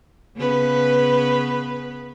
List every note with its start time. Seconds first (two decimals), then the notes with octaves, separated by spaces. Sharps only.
0.36 C#3 B3 B4